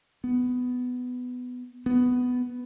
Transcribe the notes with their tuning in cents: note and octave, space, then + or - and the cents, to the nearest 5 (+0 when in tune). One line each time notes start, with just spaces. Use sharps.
B3 +10
B3 +10